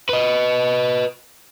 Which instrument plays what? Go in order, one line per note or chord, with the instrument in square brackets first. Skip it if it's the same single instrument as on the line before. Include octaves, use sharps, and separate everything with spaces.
[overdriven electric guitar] B4 D#5